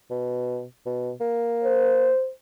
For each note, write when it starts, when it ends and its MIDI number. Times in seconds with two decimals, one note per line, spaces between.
0.11 0.64 47
0.86 1.11 47
1.20 2.10 58
1.64 2.30 72